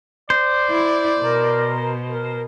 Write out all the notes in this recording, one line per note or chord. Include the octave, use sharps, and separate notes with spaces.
C5 D5
E4
B2 A#4
A#4